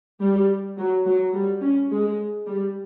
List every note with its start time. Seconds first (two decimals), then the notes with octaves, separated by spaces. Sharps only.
0.20 G3
0.77 F#3
1.06 F#3
1.34 G3
1.61 C#4
1.90 G#3
2.47 G3